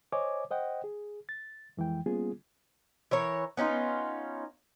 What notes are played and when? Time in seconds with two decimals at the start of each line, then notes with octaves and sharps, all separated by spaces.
0.12 C5 C#5 D#5 G#5 D6
0.50 C5 D#5 F#5 G5
0.84 G#4
1.29 A6
1.77 F2 E3 G#3 G5
2.06 G3 A#3 B3 C#4 F4 G#4
3.11 E3 A#4 C#5
3.57 B3 C#4 D#4 F4